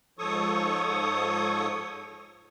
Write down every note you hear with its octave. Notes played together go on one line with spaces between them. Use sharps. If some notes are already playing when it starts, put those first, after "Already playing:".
G#2 F3 A4 C#5 C#6 D#6